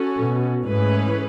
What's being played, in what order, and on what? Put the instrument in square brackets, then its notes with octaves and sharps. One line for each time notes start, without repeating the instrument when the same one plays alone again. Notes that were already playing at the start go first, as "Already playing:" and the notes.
Already playing: [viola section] C#4 F#4 A4
[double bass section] B2
[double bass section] G#2 [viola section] E3 A3 C#4 G#4 B4